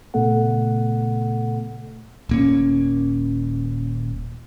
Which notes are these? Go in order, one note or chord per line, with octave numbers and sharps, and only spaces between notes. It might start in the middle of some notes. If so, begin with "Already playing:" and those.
A#2 C#3 A3 B3 A4 F#5
D#1 A#3 C#4